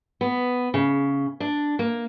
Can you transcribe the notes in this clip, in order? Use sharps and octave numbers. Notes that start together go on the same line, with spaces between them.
B3
C#3
D4
A#3